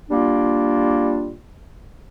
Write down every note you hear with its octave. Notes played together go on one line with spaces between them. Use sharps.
G3 A#3 D4 F4